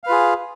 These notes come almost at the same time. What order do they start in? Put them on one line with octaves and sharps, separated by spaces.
F5 B4 F4 G#4